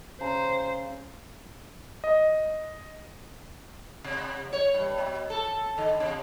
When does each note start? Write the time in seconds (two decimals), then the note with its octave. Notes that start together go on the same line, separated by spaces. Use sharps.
0.21 C#3 C5 A#5
2.04 D#5
4.04 C3
4.53 C#5
4.74 G2
4.98 B2
5.30 A4
5.78 D3
6.00 C3